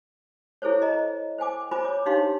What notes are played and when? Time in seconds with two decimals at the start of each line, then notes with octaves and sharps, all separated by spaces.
0.62 E4 G#4 A4 C5 C#5
0.82 D#5 A#5
1.38 C5 G5 G#5 D6
1.71 F4 C5 G#5 B5 D6
1.85 C#5 D6
2.06 D4 D#4 G4 C#5 F5 C6